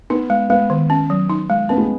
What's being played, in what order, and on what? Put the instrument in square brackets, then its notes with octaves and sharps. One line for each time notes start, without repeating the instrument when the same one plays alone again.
[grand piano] B3 [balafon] D#4
[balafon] G#3
[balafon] G#3 [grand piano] B3
[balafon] D#3
C#4
F#3
D#4
G#3
[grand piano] B3 [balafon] C#4
[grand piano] G#3